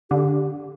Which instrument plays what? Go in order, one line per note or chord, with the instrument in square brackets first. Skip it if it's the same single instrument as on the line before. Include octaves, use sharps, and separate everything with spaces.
[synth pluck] D3 [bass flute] G4